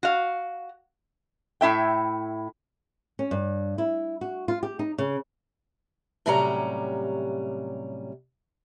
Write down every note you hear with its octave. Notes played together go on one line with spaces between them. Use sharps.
F#4 F5
A2 E4 E5 G5
C#4
G2
E4
F#4
F4
G4
D#4
C#3
A2 C3 F#3 G3 C#4 A#5